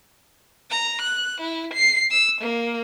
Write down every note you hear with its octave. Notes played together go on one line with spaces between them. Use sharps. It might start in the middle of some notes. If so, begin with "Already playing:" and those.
A#5
F#6
E4
C7
E6
A#3